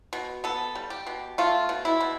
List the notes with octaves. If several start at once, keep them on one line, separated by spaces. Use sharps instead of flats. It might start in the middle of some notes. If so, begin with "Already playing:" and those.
B2
B3 A4
G3
G4
B2
A3 F4
B2
E4
B2